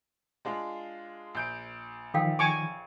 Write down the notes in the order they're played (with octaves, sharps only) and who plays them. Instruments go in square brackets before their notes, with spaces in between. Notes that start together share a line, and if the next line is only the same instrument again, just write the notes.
[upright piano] G#3 D4 F4
A#1 G6 D7
[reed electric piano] D#3 F3 [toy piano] A4 F5 G5
[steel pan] G#5 C#6 D6